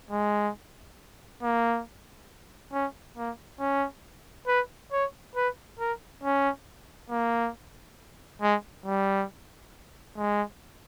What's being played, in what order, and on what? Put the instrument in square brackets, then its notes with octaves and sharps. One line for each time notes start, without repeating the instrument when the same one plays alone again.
[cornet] G#3
A#3
C#4
A#3
C#4
B4
C#5
B4
A#4
C#4
A#3
G#3
G3
G#3